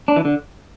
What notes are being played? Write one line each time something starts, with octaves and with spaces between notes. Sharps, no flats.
D4
E3
D3